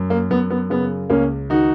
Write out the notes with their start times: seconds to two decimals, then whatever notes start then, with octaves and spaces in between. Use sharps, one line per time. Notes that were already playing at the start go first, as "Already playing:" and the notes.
Already playing: F#2
0.10 A#3
0.30 F#2 B3
0.50 B3
0.70 C#3 B3
1.10 C#2 A#3 C#4
1.50 D#3 D#4 F#4